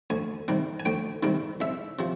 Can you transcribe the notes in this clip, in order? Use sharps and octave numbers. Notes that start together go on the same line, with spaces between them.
D2 G#5
C3 D#3 G3
G#5
D2 G5
C3 D#3 G3
C2 E5
C3 F3